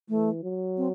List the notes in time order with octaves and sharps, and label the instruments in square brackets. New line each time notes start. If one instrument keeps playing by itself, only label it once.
[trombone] E3 [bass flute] A3
[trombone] F#3
[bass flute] C4